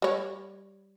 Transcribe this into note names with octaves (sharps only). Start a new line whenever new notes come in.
G3 C#5